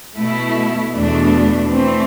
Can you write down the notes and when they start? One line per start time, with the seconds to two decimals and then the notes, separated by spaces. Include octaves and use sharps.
0.15 B2 A3 E4
0.93 E2 B2 A3 D4
1.70 E3 A3 C4